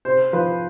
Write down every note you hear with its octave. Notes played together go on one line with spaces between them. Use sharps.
C3 C5
F3 B4